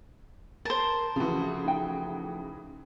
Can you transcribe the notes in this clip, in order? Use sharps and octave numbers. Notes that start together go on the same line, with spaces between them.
A#4 C5 A5
C#3 E3 F3 A3 F#4
D#4 G5